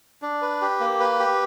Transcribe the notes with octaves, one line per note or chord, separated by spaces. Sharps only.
D4
B4
G4
A#3
B4
G4